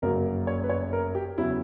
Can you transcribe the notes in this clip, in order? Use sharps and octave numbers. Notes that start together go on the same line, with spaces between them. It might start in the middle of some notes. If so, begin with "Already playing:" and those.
G1 F#2 C#3 F#3 A#3 A#4
C#5
B4
C#5
A#4
G4
E2 C#3 F#3 E4